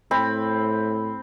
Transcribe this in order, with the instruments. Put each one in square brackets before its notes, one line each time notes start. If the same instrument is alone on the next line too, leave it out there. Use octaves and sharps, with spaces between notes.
[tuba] A2 [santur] C4 B5